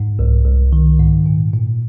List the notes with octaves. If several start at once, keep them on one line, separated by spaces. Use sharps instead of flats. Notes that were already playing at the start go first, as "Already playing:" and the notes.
Already playing: G#2
C2
C2
D#3
G#2
A#2
A#2